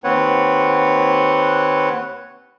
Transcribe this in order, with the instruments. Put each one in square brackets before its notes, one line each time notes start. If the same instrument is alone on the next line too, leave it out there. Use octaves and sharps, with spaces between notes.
[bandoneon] D#2 C4 B4 C#5 F#5